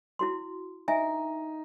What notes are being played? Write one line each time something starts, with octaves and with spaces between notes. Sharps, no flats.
E4 F#4 C6
D#4 E5 G#5